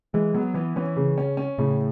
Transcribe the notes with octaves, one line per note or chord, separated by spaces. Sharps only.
E3 G#3
F#3 B3
E3 B3
E3 C#4
C#3
C#4
C#4
A2 C#3